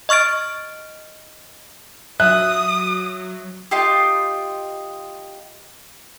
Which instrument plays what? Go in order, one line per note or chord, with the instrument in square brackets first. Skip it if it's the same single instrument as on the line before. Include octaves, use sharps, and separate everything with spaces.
[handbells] D#5 C#6 F6 A6 D7
[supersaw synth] F#3 [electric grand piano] E5 [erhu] D#6 [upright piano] F#6
[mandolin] D#4 F4 G4